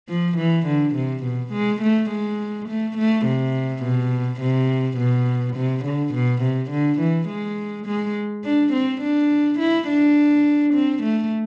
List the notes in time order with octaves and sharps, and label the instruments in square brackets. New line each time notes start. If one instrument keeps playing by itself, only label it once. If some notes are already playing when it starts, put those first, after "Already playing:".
[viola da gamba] F3
E3
D3
C3
B2
G#3
A3
G#3
A3
A3
C3
B2
C3
B2
C3
D3
B2
C3
D3
E3
G#3
G#3
D4
C4
D4
E4
D4
C4
A3